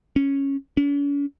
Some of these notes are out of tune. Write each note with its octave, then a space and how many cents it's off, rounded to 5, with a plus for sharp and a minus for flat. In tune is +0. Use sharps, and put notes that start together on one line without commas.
C#4 -5
C#4 +45